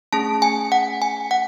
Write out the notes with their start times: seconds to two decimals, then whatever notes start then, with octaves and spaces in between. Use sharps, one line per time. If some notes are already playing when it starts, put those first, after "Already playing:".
0.13 A3 C#4 G#4 A5
0.42 G#5
0.72 F#5
1.02 G#5
1.31 F#5